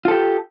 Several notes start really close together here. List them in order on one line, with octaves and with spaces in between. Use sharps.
F4 A4 G4